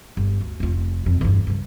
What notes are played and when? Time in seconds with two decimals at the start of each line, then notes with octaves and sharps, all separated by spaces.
0.17 G1
0.41 D2
0.60 F1 F4
1.06 F2 D#3
1.21 E2 G2
1.47 G2 C#3